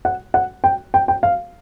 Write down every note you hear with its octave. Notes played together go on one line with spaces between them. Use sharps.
F#5
F#5
G5
G5
G5
F5